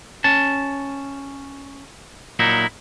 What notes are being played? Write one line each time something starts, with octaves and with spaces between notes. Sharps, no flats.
C#4 A5
A#2 F#3 D#4 E4